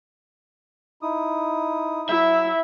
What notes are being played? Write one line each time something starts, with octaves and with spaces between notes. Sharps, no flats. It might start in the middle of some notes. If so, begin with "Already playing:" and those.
D#4 E4 D#6
F#3 E4 E5